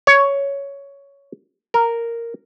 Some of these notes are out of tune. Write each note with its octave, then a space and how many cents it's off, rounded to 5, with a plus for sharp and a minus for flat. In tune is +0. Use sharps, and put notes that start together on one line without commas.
C#5 +10
A#4 -5